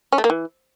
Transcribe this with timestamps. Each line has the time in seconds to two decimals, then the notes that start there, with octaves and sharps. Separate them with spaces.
0.12 C#4
0.18 A3
0.24 A#3
0.30 E3